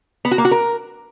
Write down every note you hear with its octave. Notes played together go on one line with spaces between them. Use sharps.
B3
F#4
A#3
F#4
A#4